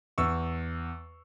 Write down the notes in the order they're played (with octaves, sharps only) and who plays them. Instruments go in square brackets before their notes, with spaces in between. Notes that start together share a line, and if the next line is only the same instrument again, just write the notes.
[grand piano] E2 C#6 E6